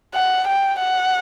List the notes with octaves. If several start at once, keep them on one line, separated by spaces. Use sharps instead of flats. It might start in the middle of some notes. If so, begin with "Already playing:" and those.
F#5
G5
F#5